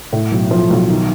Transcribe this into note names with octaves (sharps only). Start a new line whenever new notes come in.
A2
B1
F3
B1
D#3